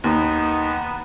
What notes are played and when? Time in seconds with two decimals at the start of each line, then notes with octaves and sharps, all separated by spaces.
0.04 D#2 B3 D#4